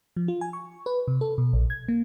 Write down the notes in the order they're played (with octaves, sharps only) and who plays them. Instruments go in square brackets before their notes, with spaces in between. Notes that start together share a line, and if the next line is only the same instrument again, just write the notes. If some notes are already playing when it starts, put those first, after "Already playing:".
[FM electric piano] F3
F4
G#5
C#6
B4
C3
A4
B2
A#1
G#6
A#3